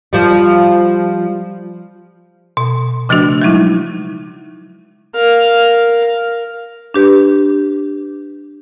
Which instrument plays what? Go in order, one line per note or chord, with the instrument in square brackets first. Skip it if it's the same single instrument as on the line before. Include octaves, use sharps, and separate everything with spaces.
[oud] F3 G3
[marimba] B2
C#3 F3 A3 D4 F#4
F#3 G#3 D#4 E4
[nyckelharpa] A#4 F5
[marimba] D4 G4 B4